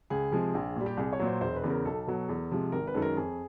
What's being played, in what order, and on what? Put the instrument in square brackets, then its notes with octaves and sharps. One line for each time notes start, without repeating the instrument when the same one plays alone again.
[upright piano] C#2 G#4
C3 F3 G#3
A#1
A#2 G3
G4
C2 G#4
C#5
A#2 F#3
C5
E1 C5
B4
E2 C#3
A#4
B1 A4
B2 F#3
E2
C3 F3 G#3
G#1 A#4
B4
F#2 D#3 G#3 A4
A#4
F2 G#4